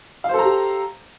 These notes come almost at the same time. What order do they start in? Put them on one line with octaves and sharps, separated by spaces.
F5 C5 A4 A#5 G4